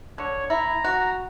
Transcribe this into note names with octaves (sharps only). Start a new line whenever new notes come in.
D3 C#5
E4 A#5
F#4